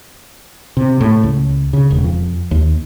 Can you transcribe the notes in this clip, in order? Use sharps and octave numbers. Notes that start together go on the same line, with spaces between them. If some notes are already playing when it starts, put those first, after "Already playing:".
C3
A2
C#2
C#3
E1
F2
D#2